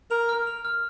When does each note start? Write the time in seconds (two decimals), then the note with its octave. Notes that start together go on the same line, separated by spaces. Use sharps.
0.11 A#4 F7
0.29 F6
0.47 F7
0.65 F6